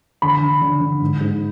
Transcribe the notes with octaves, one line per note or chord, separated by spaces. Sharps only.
D3 B5
D3
D3
D3
G#2
G#2